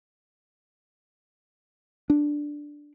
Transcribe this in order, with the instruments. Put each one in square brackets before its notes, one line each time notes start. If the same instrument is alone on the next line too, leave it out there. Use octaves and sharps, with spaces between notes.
[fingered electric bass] D4